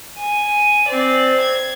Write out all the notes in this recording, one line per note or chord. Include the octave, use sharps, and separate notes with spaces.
G#5
C4 D5
G#6